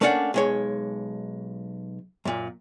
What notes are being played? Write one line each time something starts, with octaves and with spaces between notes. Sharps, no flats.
A3 A#3 C#4 D4 C5 F#5
B1 G#3 C#5
F#2 A#2